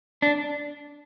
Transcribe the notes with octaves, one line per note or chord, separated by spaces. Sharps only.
D4